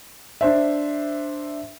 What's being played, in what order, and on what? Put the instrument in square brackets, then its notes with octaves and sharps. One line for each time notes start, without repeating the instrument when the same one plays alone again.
[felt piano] D4 C5 E5